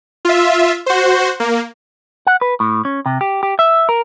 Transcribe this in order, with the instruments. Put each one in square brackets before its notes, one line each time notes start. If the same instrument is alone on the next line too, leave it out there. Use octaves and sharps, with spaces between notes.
[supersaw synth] F4 E5
F#4 C5
A#3
[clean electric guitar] F#5
B4
A2
C#4
C3
G4
G4
E5
A#4